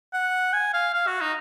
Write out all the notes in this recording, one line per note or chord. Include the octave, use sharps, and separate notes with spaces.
F#5
G#5
F5
F5
F#4
D#4